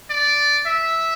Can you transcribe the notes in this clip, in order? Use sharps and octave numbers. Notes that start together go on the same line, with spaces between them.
D5
E5